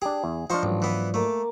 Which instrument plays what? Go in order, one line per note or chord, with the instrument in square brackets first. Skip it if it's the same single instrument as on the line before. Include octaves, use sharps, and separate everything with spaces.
[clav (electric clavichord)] D4 G4 [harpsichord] G#4
[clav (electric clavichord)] E2
[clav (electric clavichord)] F3 D4 [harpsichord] D#4 C5 C#6
[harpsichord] A1 [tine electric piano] G#2 F#3
[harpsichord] E3 B3
[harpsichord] A3 [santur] A#3 D6